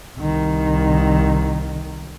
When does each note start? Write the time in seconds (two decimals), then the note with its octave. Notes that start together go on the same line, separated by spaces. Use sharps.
0.17 C2 D#3